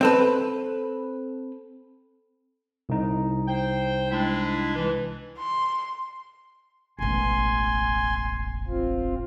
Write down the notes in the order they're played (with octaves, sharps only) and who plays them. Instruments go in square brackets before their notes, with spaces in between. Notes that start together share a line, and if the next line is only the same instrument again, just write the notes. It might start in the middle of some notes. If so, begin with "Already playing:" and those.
[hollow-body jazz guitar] C4 A4 B4
[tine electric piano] C2 D#4
[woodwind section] C5 G5
G#3 D4 E4
E3
[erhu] C6
[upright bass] E1 A1 [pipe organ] G#5 C6
[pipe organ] C4 F4